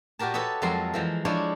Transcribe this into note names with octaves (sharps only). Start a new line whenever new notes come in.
A#2 F#4 G4 A#4 A5
A4 B4 C#5 D#5 E5
F2 F#3 G#3 A4 A#4 C6
E3 F3 G#3
F3 G#3 D4 E4 C#5